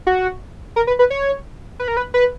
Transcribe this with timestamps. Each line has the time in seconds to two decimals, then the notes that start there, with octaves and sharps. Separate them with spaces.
0.07 F#4
0.76 A#4
0.87 B4
0.99 B4
1.10 C#5
1.79 B4
1.88 A#4
1.97 B4
2.14 B4